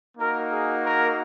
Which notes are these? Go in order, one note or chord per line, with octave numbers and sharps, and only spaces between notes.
A#3 D#4 F#4 A#4
G#4
A#4